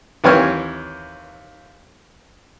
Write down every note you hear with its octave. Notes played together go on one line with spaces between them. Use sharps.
D#2 E3 C4 C#5 C#6 F6